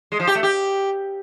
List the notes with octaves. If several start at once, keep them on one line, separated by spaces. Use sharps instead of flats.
G#3
F3
G4
A3
G4